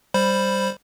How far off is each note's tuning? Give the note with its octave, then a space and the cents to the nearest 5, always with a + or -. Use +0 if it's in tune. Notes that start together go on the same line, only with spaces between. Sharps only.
G3 +0 C5 +0 B5 +0